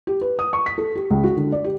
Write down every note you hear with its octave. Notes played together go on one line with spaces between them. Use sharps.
G4
B4
D#6
C#6
B6
A4
G4
C#2
F#4
D3
D5
G4